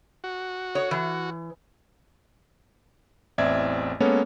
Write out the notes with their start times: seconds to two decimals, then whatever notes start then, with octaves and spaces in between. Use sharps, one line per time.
0.24 F#4
0.75 C#5
0.91 E3
3.38 A1 E2 C4 D5 E5 G#6
4.00 G#3 A#3 B3 C#4 A4 C#5